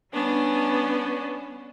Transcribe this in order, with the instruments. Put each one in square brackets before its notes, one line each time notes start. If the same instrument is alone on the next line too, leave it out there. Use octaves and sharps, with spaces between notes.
[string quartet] G3 B3 C#4 D4